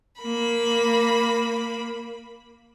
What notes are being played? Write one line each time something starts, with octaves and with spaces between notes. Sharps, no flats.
A#3 B5